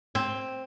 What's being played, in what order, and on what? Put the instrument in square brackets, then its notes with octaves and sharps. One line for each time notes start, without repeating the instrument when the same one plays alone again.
[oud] C4